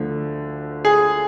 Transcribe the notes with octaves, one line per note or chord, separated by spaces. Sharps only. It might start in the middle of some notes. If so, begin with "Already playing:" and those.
Already playing: D2 D3 F3 A3
G#4